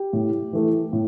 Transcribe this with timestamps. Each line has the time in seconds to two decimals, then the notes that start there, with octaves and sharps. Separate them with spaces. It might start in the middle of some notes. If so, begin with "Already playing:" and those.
Already playing: G4
0.13 A2
0.53 E3 A3
0.93 A2